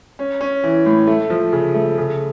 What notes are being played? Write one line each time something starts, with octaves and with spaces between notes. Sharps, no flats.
C#4
C#4
E3
A2
A3
F3
C#3
A3
C#3